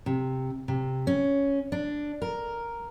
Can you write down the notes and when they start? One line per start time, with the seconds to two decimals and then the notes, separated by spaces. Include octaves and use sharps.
0.06 C3
0.68 C3
1.07 C#4
1.72 D4
2.22 A#4